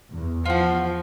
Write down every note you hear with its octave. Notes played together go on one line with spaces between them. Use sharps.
E2
F3 F4 F#4